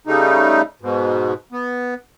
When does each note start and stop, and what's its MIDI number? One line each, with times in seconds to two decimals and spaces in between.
0.07 0.62 49
0.07 0.62 55
0.07 0.62 57
0.07 0.62 63
0.81 1.33 44
0.81 1.33 47
1.52 1.94 59